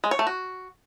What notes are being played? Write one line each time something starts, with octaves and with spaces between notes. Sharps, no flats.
G#3
C#5
A3
F#4